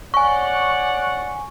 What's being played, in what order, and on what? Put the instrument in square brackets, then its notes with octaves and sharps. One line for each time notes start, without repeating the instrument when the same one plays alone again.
[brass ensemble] C#5 D5 F#5 [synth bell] G#5 C#6